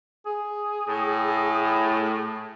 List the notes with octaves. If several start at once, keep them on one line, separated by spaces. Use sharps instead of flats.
G#4
A2